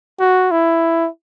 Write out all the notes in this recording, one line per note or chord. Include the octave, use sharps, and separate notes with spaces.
F#4
E4